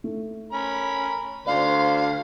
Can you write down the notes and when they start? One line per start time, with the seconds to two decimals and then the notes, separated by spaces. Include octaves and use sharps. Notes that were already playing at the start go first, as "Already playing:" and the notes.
0.04 A3
0.52 C#4 A#4 B5
1.47 D2 C5 D5 F5